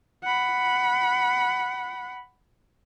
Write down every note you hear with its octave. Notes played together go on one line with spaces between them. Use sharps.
F#5 B5